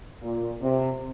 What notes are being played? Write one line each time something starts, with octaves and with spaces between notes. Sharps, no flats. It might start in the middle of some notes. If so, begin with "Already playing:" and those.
A#2
C3